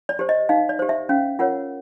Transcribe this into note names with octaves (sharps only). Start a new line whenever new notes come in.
D5
G4 C5
D#5
D#4 F5
D5
G4 C5
E5
C#4 F5
F4 A#4 C#5 F#5